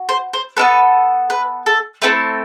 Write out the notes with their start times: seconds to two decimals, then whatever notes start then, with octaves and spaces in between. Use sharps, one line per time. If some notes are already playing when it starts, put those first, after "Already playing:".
Already playing: F#4
0.09 C5
0.33 C5
0.57 B3 D4 A4 B4
1.30 B4
1.66 A4
2.02 A3 C4 E4 A4 B4